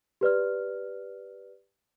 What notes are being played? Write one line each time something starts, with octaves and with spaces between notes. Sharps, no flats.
G4 B4 D5 F6